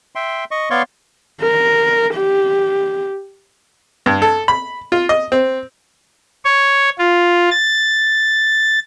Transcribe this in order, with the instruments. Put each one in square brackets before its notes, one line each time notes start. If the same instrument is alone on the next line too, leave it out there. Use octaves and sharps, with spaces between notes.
[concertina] E5 G5 C6
D#5 C#6
B3 C#5 D5 F5 C6 C#6
[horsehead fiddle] A#4
G4
[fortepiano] G2
A4
B5
F4
D#5
C4
[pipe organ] C#5
F4
A6